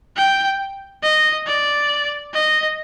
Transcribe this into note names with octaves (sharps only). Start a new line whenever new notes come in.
G5
D#5
D5
D#5